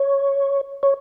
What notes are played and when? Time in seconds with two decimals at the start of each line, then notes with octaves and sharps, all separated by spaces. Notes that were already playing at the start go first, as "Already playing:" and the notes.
Already playing: C#5
0.83 C#5